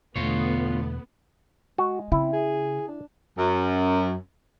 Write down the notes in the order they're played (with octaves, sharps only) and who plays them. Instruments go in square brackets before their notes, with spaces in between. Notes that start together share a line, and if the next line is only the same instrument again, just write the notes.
[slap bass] E2 B2 [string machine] D3 A3 [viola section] B3 [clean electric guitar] F4 C#5
[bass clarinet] G#3 [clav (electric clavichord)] F#4
[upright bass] C#3 [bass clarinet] C4 [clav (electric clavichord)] E4
[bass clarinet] G#4
D4
[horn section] F#2